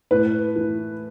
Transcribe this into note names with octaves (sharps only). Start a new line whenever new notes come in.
A2 B4
E3